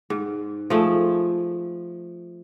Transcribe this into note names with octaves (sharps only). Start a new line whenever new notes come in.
G#2
F3 A3 G#4